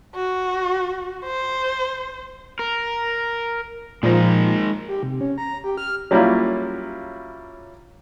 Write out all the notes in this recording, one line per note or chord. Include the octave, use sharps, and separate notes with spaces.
F#4
C5
A#4
A#2 F3 G#3 D#4 A#4
G4
C3
C#4
A#5
G4
F6
F#3 G3 A#3 C#4 E4 F4